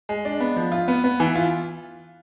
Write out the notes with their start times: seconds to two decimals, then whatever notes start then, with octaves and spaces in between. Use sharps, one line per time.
0.09 G#3
0.25 D4
0.40 B3
0.56 F3
0.72 F4
0.88 B3
1.04 B3
1.20 E3
1.35 F4